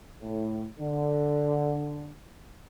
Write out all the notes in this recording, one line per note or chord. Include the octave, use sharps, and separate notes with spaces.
A2
D3